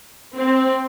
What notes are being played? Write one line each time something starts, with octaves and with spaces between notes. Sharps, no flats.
C4